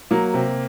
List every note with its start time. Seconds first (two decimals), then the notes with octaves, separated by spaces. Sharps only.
0.11 F#3 A#3
0.34 C3